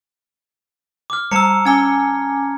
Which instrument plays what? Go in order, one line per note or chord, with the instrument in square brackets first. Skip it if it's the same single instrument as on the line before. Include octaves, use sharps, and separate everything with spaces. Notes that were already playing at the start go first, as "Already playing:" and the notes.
[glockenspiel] D6 F6
[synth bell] G3 E6 [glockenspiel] A5 A#5 C#7
[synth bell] C#4 G#5 D6 [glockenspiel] G#6